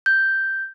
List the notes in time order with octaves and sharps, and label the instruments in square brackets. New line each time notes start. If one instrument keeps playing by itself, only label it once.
[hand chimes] G6